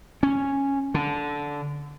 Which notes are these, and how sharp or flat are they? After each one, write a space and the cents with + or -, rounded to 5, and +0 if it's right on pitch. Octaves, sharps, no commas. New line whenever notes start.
C#4 -5
D3 -15